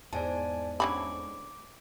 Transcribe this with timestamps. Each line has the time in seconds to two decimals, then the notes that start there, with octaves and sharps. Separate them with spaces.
0.13 E2 G#2 D5 G#5 A5
0.80 D3 C#4 B5 D6